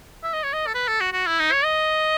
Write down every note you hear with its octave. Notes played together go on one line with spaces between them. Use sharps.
E5
D#5
C#5
D#5
A4
B4
A4
F#4
F#4
E4
D#4
C#5
D#5